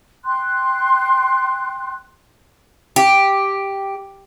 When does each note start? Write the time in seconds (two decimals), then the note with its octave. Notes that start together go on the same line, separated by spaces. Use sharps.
0.25 G5 C6 F#6
2.96 G4